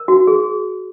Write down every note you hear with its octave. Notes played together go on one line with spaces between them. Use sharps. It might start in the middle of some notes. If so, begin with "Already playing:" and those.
Already playing: A#4
F#4
G#4